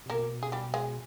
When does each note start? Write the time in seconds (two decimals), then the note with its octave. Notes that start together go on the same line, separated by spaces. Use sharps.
0.06 C3
0.10 B2 A#3 A#4
0.43 G#4
0.52 G3 G4
0.74 G#3 G#4